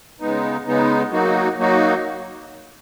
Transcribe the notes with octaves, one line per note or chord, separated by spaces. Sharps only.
C#3 G#3 B3 D#4
C#3 G#3 B3 D#4
F#3 A#3 D#4 F#4
F#3 A#3 D#4 F#4